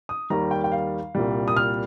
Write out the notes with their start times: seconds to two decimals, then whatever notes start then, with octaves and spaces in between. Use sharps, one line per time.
0.09 D#6
0.30 D#2 D#3 G3 A#5
0.51 G5
0.64 G5
0.72 F5
1.15 C2 A#2 G3
1.48 D#6
1.57 F6